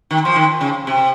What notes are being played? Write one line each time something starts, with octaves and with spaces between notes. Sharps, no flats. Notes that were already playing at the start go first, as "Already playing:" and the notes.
D#3
F3
D#3
C#3
C3